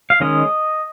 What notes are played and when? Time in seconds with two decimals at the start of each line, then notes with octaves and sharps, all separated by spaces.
0.10 F5
0.20 D#3 G#3 C#4 D#5